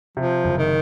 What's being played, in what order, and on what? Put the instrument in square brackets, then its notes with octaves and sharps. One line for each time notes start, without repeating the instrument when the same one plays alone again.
[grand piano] C3 [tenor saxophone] F3
[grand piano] F#1
[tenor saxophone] D#3